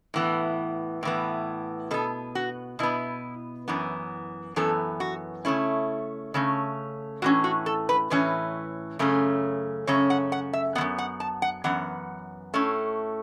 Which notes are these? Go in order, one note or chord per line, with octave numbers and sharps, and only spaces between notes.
A2 E3 B3
A2 E3 B3
B2 B3 A4
F#4
B2 B3 E4
F#2 E3 B3
F#2 E3 B3 A4
F#4
C#3 A3 C#4 E4
C#3 A3 C#4
A2 E3 C#4 F#4
F#4
A4
B4
A2 E3 C#4 B4
F#2 C#3 A3 C#4
F#2 C#3 A3 C#4 C#5
F#5
F#5
E5
E3 B3 F#5
F#2
F#5
A5
F#5
F#2 E3 B3 F#5
A2 A3 C#4